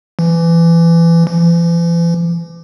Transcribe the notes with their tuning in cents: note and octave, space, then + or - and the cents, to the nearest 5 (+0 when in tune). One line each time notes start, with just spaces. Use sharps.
E3 +25
E3 +45